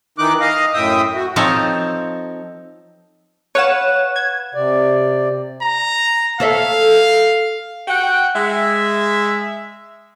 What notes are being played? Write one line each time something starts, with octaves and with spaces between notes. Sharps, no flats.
D#3 E3 D#4 D6 F#6
D#5 F5
F#2 A2 E5 G5 D#6
F#4
F3 C4 D#4 A4 C#5
B4 C#5 F5 F#5 E7
G#6
C3 D5
A#5
A4 C#5 E5 F5
F#4 F#5 G5
G#3 E5